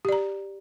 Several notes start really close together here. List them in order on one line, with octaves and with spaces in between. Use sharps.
G4 D5 A#5